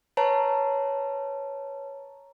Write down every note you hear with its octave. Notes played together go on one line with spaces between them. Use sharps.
B4 C#5 A5 A#5